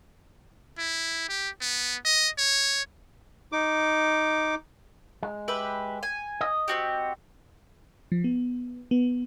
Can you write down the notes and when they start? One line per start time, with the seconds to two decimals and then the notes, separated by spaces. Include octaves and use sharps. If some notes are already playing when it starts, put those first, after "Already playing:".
0.78 E4
1.29 G4
1.61 B3
2.05 D#5
2.38 C#5
3.52 D#4 D6
5.23 G#3
5.48 G4 B4 E5
6.03 G#5
6.41 D#5
6.68 C4 F#4 G4
8.12 F3
8.24 B3
8.91 B3